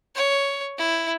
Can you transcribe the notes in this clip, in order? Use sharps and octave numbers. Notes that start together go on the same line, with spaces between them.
C#5
E4